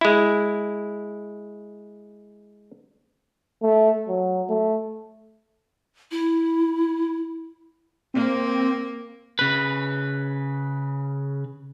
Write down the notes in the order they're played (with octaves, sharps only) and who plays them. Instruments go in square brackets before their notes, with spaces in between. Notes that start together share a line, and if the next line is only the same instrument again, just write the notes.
[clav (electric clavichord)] G#3 E4
[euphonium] A3
F#3
A3
[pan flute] E4
[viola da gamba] A#3 [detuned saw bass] C4
[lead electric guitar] C#3 B4